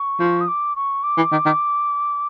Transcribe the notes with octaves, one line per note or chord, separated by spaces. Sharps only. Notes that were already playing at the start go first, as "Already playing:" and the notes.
Already playing: C#6
F3
D#6
D6
C#6
D6
E3
D#3
D#3